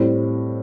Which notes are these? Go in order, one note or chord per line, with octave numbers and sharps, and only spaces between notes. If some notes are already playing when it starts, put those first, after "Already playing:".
Already playing: A2 G3 C4